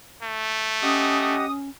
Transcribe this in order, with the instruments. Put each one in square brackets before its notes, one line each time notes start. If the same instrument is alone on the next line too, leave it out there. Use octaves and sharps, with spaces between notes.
[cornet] A3
[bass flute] C#4 [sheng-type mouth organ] G4 D#5 F#5 [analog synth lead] D#6